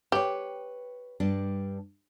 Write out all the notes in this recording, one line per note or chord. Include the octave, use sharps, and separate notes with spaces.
G4 B4 C#5
G2 G3 D4